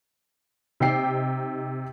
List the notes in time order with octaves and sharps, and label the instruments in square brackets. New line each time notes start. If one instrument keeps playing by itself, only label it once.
[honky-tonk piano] C3 D#4 G4 G5 C7